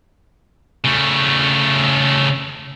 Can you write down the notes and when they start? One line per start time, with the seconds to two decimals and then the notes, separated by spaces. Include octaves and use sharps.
0.85 C#3 A3